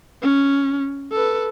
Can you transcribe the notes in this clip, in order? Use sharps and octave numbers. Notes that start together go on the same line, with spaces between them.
C#4
A4 B4